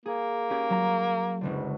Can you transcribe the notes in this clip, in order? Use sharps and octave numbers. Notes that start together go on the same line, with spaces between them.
A#3 G#4
C#4 G4 G#4
F#3 A#5
F#1 C#2 D3